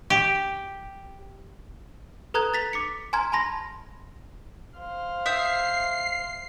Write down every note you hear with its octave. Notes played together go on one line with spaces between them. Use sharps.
G4
A4 B4 A#5 D#6 F#6 G#6
A6 B6 F7
D6 B6 C#7
G#5 A#5 C6 F6 G#6
G#5 A5 B5 C6 A#6
C5 F5
E5 D#6 G6 C7